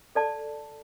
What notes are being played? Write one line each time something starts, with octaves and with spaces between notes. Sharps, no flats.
A4 D5 A5